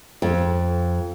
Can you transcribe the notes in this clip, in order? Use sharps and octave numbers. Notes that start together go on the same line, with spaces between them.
F2